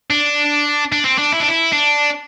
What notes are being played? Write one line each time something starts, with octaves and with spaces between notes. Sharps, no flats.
D4
D4
C4
D4
E4
D4
E4
D4